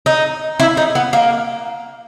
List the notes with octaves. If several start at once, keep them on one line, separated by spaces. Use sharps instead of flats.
D#4
E4
D#4
B3
A#3